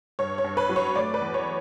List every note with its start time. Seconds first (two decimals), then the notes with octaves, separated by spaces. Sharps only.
0.19 G2 C#5
0.38 C#5
0.44 G2
0.57 B4
0.69 F#3
0.76 C#5
0.96 A3 D5
1.14 B4
1.21 E2
1.34 C#5